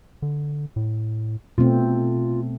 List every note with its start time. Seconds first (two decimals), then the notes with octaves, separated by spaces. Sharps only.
0.22 D3
0.76 A2
1.58 B2 A3 C4 F4